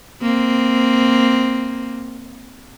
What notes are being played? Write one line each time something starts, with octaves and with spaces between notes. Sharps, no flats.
A#3 C4